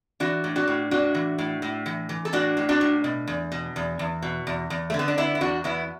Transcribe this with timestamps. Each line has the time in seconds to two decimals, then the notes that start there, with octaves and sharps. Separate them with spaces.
0.20 E3 D4 F#4
0.44 A2
0.56 D4 F#4
0.68 A2
0.91 A2 D4 F#4
1.15 E3
1.38 A2
1.62 A2
1.86 E3
2.09 E3
2.25 A4
2.33 A2 D4 F#4
2.57 A2
2.69 D4 F#4
2.81 A2
3.04 B2
3.27 E2
3.52 B2
3.76 E2
3.99 E2
4.22 B2
4.47 E2
4.70 E2
4.90 A3
4.94 D3
4.99 B3
5.08 D4
5.18 D3 B3 E4
5.35 E4
5.41 E2 D4 F#4
5.64 E2 B3 E4